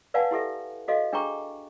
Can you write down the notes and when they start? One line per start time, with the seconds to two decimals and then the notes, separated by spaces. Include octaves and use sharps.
0.14 B4 D5 F5 F#5 G#5 A5
0.31 E4 G4 A4 E5
0.88 F#4 A4 D#5 F5
1.13 D4 G#4 G5 A#5 C#6